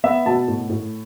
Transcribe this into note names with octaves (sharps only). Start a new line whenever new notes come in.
B3 E5
B2 A5
A2
A2